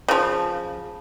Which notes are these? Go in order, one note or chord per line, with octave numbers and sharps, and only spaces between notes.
C#3 F3